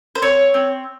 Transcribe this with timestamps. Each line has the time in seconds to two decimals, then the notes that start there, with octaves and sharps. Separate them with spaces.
0.15 C5
0.22 C4 C#5
0.54 C4